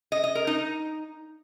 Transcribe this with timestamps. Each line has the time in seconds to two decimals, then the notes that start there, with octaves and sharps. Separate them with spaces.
0.12 D#5
0.24 D#5
0.35 A#4
0.47 D#4